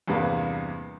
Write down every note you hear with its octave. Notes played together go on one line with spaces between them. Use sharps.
E2 G2 C3 A#3 B3